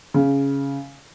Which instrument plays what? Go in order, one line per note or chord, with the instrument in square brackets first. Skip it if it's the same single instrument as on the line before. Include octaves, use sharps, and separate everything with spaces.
[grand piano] C#3